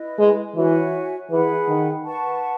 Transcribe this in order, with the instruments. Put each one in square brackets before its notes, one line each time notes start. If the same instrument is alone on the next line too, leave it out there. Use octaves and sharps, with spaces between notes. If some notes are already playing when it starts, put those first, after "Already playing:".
Already playing: [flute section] E4 B4 D#5
[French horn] G#3
[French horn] E3 [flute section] F#4 C#5 E5 G#5
[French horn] E3 [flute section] G#4 B4 F#5 B5
[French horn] D#3
[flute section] B4 F#5 A5 C#6